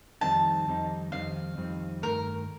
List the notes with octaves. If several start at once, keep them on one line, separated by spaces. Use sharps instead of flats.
F2 D#3 G3 C4 D#4 A5
F2 D#3 G3 C4 D#4
F2 D#3 G3 C4 D#4 F5
F2 D#3 G3 C4 D#4
G2 D#3 A3 A#4